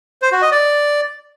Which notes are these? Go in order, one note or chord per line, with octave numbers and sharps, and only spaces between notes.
C5
F#4
D#5
D5